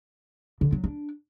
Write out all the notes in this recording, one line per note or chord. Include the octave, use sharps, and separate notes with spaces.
D3
F#3
D4